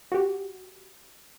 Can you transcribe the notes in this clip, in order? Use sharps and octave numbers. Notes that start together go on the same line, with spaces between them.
F#4 G4